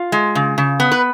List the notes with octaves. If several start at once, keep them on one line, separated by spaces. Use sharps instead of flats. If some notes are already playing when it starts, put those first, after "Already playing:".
Already playing: F4
G#3
C#3
C#3
B3
B4